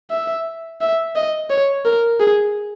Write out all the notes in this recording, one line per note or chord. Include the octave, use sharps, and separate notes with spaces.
E5
E5
D#5
C#5
A#4
G#4